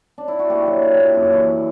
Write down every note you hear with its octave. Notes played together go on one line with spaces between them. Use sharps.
D4
E4
F#4
A#3 G4
F#3
F#3
A#2
F#2
E3